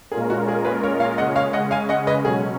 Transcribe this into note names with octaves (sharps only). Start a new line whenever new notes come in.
A#2 G#3 C#4 F4 G#4 A#4
F#4
G#4
G#4 B4
A#4 C#5
C#5 F5
C#3 G#3 C#4 D#5 F#5
C#5 F5
D#5 F#5
F5 G#5
D#5 F#5
B4 D#5
B2 F#3 C#4 G#4